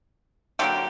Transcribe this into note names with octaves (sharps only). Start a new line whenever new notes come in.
D3 F#3 A#3 G4